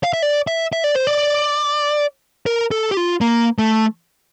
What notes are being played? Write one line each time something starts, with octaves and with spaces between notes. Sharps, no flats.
F5
E5
D5
E5
E5
D5
C5
D5
A#4
A4
G4
F4
A#3
A3